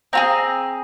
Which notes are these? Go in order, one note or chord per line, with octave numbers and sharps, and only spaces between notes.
C4 F4 G#4 A#5